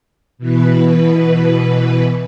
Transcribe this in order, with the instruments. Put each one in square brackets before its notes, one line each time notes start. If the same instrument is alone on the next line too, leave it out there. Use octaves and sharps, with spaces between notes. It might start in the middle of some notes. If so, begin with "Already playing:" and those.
[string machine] B2 E3 B4